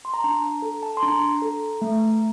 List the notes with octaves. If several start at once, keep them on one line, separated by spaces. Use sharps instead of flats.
C6
A#5
D4 A5
A#5
A4
A5
C6
D4 A#5
A4
A3